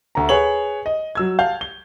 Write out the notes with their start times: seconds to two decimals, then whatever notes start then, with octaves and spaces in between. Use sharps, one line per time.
0.15 D2 A#5
0.29 G#4 B4 C#5 F#7
0.86 D#5
1.15 F#3 E6 G#6
1.39 F5 A5 G6
1.61 G7